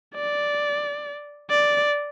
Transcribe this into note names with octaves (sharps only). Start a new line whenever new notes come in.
D5
D5